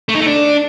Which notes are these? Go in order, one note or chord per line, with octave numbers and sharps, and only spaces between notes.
A3
D#4
A3
D4